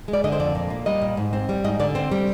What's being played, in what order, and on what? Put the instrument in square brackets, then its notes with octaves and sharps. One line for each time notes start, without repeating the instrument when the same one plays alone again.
[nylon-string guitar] G#3
D5
D3 D#5
C5
F2 D5
A#2
A#3
G3 D#5
A#2
G#2
C4
G3
G#2 D#5
D3 D5
C4 C5
G3